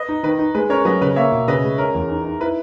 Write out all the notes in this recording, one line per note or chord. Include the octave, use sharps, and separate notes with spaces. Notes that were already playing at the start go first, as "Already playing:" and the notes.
Already playing: B4 D#5
D#4
D#3 B4
D#4
G#3 B4
C#4 A#4 C#5
F#3 B4 D#5
C#3 B4
A#3 C#5 E5
B2
C#3 B4 D#5
G#3
C#4 A#4
E2
D#4
D#4
E4 B4